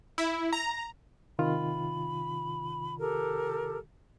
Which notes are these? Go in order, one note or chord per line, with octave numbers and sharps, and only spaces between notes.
E4
A#5
C3 D#3 F4 B5
G4 A4 A#4